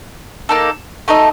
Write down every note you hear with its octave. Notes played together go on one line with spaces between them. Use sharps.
A#3 D#4 A4
A3 D#4 A4 D#5